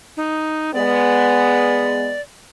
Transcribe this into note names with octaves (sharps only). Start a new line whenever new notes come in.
D#4
G#3 B3 D5